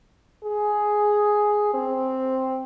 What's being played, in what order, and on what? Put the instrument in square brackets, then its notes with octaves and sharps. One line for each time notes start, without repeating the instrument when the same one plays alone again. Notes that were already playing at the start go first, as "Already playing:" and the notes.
[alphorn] G#4
C4